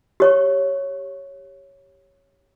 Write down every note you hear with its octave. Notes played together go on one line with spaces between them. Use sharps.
G4 C#5 C#6